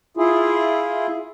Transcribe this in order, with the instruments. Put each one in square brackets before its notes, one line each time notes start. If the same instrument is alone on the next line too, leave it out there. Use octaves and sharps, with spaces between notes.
[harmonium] E4 F4 G#4